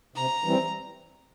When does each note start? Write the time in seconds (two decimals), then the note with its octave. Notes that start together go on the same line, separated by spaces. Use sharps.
0.16 C3 A#5
0.44 E3 G3 C4